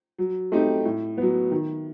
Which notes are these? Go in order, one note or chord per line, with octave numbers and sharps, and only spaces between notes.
F#3
A3 C4 D#4 G4
A2
F#3 B3
D#3